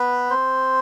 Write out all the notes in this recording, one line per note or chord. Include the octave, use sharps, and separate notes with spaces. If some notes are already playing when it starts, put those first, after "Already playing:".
Already playing: B3 B4
C4 C5